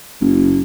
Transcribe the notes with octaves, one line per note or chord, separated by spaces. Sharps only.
F#1